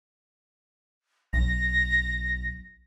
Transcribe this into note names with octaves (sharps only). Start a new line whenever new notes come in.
B1 A#6